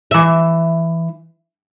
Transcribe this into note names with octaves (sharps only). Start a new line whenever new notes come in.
E3 E5